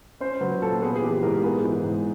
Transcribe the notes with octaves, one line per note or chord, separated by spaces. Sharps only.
C#4 C5
F#3 B4
A#2 A4
B3 G#4
G#4
E3 G4
G#2 A#4
B3 G#4
E3
G#2